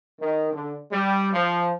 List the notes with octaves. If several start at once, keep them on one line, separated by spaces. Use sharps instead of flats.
D#3
D3
G3
F3